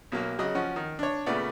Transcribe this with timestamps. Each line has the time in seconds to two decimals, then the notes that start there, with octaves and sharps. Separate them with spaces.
0.12 B1 F#3 A#3
0.39 C#3 F#3 D#5
0.55 F3 C#4 F#4
0.76 D#3
0.99 D4 C#5
1.26 A#2 C#3 A3 B3 D5